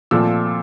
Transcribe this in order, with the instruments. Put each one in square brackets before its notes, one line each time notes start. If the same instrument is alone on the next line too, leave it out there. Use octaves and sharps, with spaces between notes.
[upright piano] A#2 F3 A3 C4 E6